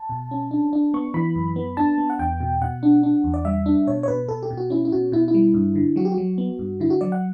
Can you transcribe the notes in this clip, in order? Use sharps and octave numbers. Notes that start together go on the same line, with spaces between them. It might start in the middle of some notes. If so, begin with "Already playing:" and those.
Already playing: A5
B2
C#4
D4
D4
B3 C#6
E3 B5
F#2
B3
D4 A5
B3
F#5
E2 G5
B2
B2 F#5
D4
D4
E2
D5
G3 E5
D4
B2 C#5
C#5
B2 B4
B2 A4
G4
B2
F#4
C#4 E4
E4
B2 F#4
B2 E4
E4
G3
G2
D3
F#3 F#4
G4
F#4
F#3
B3
G2
D3 E4
F#4
F#3 D5
F#5